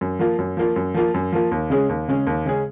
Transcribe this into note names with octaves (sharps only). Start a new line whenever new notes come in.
F#2
F3 A#3 F4
F#2
F3 A#3 F4
F#2
F3 A#3 F4
F#2
F3 A#3 F4
D#2
C#3 G#3 C#4 G#4
D#2
C#3 G#3 C#4 G#4
D#2
C#3 G#3 C#4 G#4